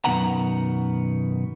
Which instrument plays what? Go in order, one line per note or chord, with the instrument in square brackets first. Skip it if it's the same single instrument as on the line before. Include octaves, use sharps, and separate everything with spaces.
[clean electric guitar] F#2 B2 D#3 B3 F#5 A#5